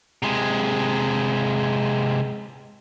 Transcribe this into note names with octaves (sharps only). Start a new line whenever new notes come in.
C3 G#3